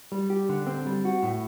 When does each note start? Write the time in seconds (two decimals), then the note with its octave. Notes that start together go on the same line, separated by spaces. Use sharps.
0.12 G3
0.30 G4
0.49 D3
0.67 C4
0.86 G3
1.05 F#4
1.23 A2